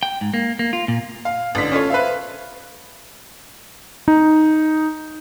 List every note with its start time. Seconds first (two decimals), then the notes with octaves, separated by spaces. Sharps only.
0.03 G5
0.21 G#2
0.34 A#3
0.59 A#3
0.73 F4
0.88 A#2
1.25 F5
1.55 A1 D3 B6
1.72 C#4 F4 A4 C#5
1.90 B4 C5 E5 F5
4.08 D#4